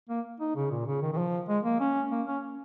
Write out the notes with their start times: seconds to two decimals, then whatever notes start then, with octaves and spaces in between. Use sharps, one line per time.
0.09 A#3
0.40 D#4
0.56 C#3
0.71 A#2
0.87 C#3
1.02 D#3
1.13 D#3
1.18 F3
1.48 G#3
1.65 A#3
1.80 C#4
2.11 A#3
2.27 C#4